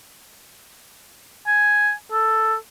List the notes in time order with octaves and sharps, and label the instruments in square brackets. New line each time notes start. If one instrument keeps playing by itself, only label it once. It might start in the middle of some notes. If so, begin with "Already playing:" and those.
[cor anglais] G#5
A4